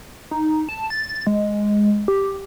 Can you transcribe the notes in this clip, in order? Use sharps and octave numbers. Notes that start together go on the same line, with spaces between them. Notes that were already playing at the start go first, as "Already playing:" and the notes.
D#4
A5
A6
G#3
G4